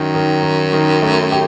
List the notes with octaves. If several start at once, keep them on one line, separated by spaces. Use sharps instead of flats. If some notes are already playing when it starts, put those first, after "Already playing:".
Already playing: F#2 D#3
D#3
D#3
D#3
A3
G4